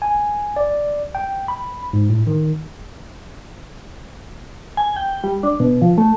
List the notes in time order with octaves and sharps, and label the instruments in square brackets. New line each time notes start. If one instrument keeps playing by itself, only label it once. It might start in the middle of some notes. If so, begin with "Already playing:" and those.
[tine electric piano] G#5
D5
G5
B5
G#2
A2
D#3
[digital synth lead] G#5
G5
G3
D4
B2
F3
A3